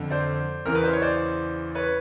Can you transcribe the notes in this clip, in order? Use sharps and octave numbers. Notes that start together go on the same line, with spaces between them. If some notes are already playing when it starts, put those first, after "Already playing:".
Already playing: F2 D3
C5 D5
E2 C#3 E3 A#4
B4
C5
C#5
C5 D5
B4 C#5